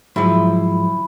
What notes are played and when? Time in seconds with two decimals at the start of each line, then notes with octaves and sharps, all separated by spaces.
0.16 G#2 D3 F3 F#3 E4 F#4